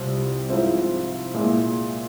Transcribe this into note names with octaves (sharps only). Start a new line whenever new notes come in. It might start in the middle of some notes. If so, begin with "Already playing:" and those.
Already playing: C2 C3 G3 C4 F4
G#2 F3 C4 E4
A#2 G#3 E4